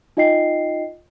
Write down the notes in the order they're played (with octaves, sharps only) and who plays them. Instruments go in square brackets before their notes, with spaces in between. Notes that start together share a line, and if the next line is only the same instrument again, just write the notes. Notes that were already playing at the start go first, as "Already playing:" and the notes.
[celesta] D#4 F4 D#5 G5 C7